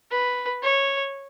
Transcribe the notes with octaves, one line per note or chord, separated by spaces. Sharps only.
B4
C#5